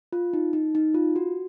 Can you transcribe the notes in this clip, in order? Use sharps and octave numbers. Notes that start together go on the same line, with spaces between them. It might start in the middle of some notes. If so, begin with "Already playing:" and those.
F4
D#4
D#4
D#4
F4
F#4